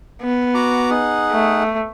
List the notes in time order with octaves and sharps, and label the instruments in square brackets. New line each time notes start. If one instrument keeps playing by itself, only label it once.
[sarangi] B3
[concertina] F#4 A#5 D6
D#4 G#4 F#5
[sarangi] A3